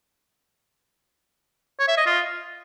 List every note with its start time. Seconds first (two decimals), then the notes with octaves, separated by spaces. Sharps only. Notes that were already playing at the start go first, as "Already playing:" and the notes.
1.79 C#5
1.88 E5
1.97 D#5
2.06 F4